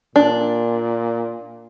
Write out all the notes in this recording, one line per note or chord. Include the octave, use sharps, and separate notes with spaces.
A#2 D4